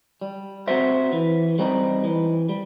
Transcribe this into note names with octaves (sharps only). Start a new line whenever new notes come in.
G3
C4 F#4 C5 E5
E3
G3 C4 D#4
E3
G3